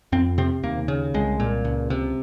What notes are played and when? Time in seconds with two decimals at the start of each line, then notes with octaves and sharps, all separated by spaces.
0.12 F2 C4
0.38 C3 C4
0.63 D#2 A#3
0.88 C#3
1.14 C2 G#3
1.40 A#2
1.65 C#2
1.90 C3